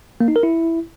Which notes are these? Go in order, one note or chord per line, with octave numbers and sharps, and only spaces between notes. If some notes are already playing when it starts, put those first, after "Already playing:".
A#3
D#4
A#4
E4